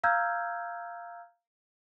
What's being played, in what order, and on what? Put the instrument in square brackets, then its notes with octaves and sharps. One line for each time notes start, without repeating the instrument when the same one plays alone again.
[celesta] F5 A#5 E6 F6 G6 G#6